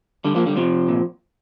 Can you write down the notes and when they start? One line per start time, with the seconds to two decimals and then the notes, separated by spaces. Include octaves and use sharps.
0.25 D3 G3
0.35 F3 A#3
0.46 D3 G3
0.57 C3 F3
0.88 A#2